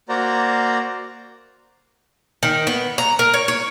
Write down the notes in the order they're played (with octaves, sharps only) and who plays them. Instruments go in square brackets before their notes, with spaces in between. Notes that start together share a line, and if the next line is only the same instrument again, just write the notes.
[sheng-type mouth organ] A#3 F#4 C5 D5 A#5
[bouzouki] D#3
B3
A#5
A#4
C#5
C#5